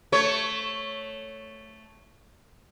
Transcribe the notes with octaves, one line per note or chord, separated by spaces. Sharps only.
A3 C#5